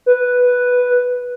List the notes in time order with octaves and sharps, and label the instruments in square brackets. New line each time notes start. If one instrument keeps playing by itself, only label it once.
[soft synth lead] B4